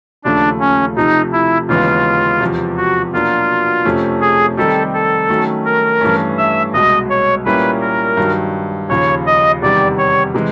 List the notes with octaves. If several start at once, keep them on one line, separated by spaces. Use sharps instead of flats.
D#2 C#3 F3 A3 D4
C#4
C3 F3 A3 D#4
E4
D#2 C#3 E3 G#3 B3 F4
E2 C3 F3
F#4
B2 F#3 A#3 D4 F4
F2 C3 F3 A3 C#4
G#4
D#3 G3 C4 D#4 G4 A4
A4
D#3 F#3 A3 C#4
A#4
G2 E3 A3 C#4
E5
C2 B2 G#3 D#5
C#5
A#2 G3 A#3 C#4 E4 B4
A#4
G2 D#3 F#3
D#2 C#3 F3 C#5
D#5
E2 C3 D#3 G3 D5
C#5
C3 E3 G#3